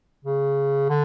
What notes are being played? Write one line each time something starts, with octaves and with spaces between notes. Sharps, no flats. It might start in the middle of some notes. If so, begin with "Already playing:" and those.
C#3
D3